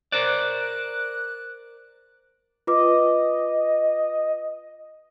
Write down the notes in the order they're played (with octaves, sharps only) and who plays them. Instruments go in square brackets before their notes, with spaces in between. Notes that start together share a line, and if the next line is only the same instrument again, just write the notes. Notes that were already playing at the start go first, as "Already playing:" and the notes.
[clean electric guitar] A#4 C5 D5 [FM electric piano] F#6
[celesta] F4 B4 D6 [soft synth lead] D#5